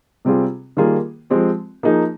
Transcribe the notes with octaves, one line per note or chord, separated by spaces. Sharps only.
C3 G3 C4 F4 G#4
D#3 G3 A#3 F4 G#4
F3 G#3 C4 G4
F3 A#3 D#4 G#4